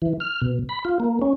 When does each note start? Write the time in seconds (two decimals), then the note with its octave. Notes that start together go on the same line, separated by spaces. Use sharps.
0.02 E3
0.20 F6
0.42 B2
0.69 B5
0.85 F4
1.00 A#3
1.22 C#4